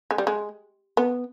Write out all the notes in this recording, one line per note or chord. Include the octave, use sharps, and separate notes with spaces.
G#3
G3
G#3
B3